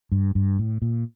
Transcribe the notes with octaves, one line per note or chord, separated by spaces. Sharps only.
G2
G2
A2
A#2